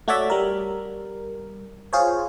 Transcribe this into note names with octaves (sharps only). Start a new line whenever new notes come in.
A3 F#4 C#5 D5 E5
G3 A#4
F4 G#4 C5 C#5